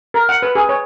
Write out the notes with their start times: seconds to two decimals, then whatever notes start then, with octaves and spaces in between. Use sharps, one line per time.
0.14 A#4
0.29 F#5
0.42 B4
0.55 G#4
0.69 C#5